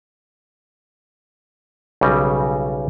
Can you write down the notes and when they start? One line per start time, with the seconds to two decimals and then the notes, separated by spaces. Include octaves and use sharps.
2.01 B1 C#3 G3 D#5